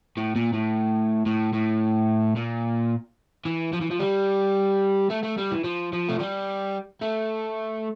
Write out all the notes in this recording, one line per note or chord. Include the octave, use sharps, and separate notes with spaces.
A2
A#2
A2
A2
A2
A#2
E3
F3
E3
F3
G3
A3
A3
G3
E3
F3
F3
A3
G3
A3